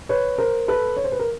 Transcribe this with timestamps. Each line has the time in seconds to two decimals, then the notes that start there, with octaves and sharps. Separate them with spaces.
0.09 B4 C#5
0.38 A#4 C5
0.68 A4 B4
0.97 C#5
1.04 C5
1.12 B4
1.19 A#4